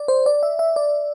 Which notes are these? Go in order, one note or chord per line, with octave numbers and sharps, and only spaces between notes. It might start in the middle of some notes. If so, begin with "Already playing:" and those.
Already playing: D5
C5
D5
E5
E5
D5